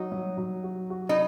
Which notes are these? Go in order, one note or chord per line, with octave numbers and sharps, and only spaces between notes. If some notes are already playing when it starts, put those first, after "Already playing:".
Already playing: F#3 D#4 F#4
F#3
F#3
F#4
F#4
D#4